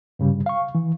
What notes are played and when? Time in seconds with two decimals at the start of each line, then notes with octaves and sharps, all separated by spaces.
0.19 G2 C#3 G3
0.46 F5 C#6
0.75 E3